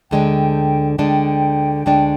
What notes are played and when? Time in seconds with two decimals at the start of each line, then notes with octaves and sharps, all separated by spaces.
0.11 D2 D3 G#3 D4 G5
0.98 D2 D3 G#3 D4 G5
1.86 D2 D3 G#3 D4